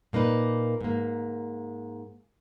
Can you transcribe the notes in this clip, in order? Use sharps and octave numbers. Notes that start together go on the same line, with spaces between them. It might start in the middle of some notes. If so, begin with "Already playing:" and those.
A#2 A#3 D#4 B4
G#2 A#3